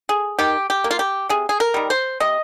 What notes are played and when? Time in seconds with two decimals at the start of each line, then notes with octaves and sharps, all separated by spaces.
0.09 G#4
0.39 D#3 G4
0.70 G4
0.84 A#3
0.91 F4
0.99 G4
1.29 C3 G#4
1.49 G#4
1.60 A#4
1.74 D#3 G3
1.90 C5
2.20 C3 D#5